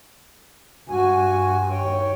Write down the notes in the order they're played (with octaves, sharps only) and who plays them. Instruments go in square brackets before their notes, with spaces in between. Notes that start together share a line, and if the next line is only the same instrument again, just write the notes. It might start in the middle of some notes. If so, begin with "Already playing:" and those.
[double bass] G2 [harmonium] F#4 G#5
[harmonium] D#2 C#5 G5